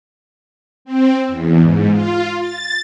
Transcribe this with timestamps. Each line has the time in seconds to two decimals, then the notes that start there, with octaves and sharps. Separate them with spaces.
0.85 C4
1.28 E2
1.61 G#2
1.91 F4
2.40 A6